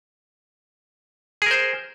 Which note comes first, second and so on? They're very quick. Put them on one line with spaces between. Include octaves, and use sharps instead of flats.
G#4 A#4 C5